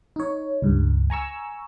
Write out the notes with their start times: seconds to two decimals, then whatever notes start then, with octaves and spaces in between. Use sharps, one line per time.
0.16 D#4 C#5
0.62 C#2 G2
1.10 G#5 A#5 C#6 E6